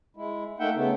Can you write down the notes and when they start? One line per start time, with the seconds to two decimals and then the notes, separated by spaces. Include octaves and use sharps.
0.16 G#3 E4
0.59 A3 A#3 D#4 E5 F#5 G5
0.75 C#3 A3 B3